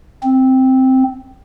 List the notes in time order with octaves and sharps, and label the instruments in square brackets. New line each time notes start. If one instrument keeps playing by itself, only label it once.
[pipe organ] C4